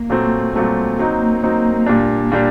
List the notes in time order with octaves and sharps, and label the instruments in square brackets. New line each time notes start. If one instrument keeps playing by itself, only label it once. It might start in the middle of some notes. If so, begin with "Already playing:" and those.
Already playing: [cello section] A#3
[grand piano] A#2 F#3 A3 C4
[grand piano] A#2 F#3 A3 C4 [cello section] G3
[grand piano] F#3 C4 D#4 [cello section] A#3
[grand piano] F#3 C4 D#4
A#2 G3 D4
A#2 G3 D4